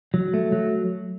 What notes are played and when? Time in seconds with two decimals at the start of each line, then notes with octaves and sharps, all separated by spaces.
0.14 F#3
0.34 A3
0.52 F#3